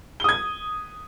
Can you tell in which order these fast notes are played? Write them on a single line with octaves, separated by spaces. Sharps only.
G7 D#6 G#6